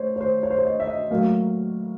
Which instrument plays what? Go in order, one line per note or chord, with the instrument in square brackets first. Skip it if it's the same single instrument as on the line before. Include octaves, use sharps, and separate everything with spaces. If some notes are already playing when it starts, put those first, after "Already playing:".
Already playing: [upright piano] A3 C5 C#5
C#5
C5
C#5
C5
C#5
D#5
E5
D#5
A2 F#3 A#3 F5